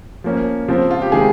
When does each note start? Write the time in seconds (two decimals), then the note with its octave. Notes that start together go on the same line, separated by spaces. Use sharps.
0.24 F3 A#3 C#4
0.68 C#3 F3 C4
0.91 F4
1.02 G4
1.12 C3 D#3 G#3 G#4